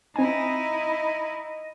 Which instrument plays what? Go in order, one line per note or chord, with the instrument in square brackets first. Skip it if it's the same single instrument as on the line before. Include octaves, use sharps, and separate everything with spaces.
[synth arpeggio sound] C4 G#5 [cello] D#4 E4 [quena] D#5